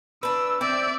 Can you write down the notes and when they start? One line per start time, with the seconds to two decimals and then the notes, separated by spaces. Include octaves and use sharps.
0.23 D4 B4 E6
0.61 C4 D5 E5